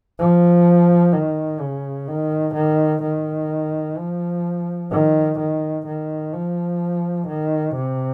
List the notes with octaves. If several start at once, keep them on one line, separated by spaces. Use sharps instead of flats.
F3
D#3
C#3
D#3
D#3
D#3
F3
D#3
D#3
D#3
F3
D#3
C3